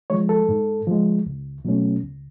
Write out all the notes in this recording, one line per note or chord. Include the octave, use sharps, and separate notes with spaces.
F3 G#3 C#5
A4
G#2
F3 G#3
C#2
B2 F#3 A3 C#4
C#2